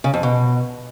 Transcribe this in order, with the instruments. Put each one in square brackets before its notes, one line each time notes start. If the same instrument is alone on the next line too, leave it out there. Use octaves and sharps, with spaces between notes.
[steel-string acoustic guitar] C#3
F2
B2